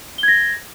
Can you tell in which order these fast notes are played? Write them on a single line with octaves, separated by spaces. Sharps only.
G7 G#6 A#6